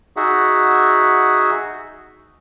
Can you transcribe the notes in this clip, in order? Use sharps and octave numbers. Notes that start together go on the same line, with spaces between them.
D#4 F#4 G#4 E5 F#5